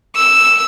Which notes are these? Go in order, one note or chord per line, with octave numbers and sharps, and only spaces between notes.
E6